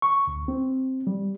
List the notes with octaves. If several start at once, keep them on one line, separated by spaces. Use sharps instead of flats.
C#6
D2
C4
G3